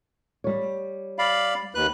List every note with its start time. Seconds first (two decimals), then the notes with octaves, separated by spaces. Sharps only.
0.44 G3 C#5
1.19 D5 F5 B5
1.75 D#2 B4 F#6